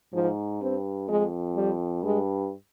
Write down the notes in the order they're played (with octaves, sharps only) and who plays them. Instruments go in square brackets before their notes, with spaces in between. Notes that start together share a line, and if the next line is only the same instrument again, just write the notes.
[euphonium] G#2 [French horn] F3
[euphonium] G2 [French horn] C4
[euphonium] F2 [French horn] G#3
[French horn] G3
[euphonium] G2 [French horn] G#3